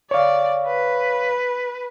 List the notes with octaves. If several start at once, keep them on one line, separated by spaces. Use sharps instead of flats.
C#5 D5 F5
B4